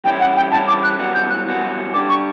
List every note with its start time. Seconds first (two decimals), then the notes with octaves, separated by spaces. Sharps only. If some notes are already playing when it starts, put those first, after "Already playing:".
0.05 E3 G3 C#4 E4 G5
0.20 F#5
0.36 G5
0.51 E3 G3 C#4 E4 A5
0.67 D6
0.84 F#6
0.98 F#2 E3 G3 B3 F#4
1.14 G6
1.30 F#6
1.46 F#2 E3 G3 B3 F#4
1.93 D3 G3 D4 G4 D6
2.09 C#6